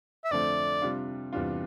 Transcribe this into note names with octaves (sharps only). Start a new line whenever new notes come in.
E5
F2 D3 F3 A3 D5
C3 G3 D4 F4
E2 C3 G3 D4 F4